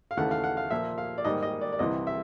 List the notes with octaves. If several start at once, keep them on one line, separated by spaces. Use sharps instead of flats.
F5
D#2 C#3 E3 A3 F#5
F5
F#5
F5
A#2 F3 A#3 E5
F5
D5
G#2 D#3 G3 A#3 D#5
D#5
D5
D5
C2 C3 E3 D#5
E5